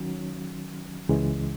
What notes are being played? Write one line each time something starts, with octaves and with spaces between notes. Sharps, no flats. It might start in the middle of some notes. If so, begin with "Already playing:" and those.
Already playing: D#3 F#3 C#4
C#2 C#3 E3 G#3